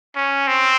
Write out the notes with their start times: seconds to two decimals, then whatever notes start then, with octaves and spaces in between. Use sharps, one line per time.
0.16 C#4
0.47 C4